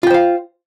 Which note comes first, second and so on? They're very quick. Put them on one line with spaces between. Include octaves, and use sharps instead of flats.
F4 G5 C5 F5